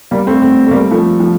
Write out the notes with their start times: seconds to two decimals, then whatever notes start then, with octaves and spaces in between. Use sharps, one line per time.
0.11 G3 A#3
0.27 A3 C4
0.42 A3 C4
0.67 A3
0.71 G3 A#3
0.91 F3 A3
1.20 F3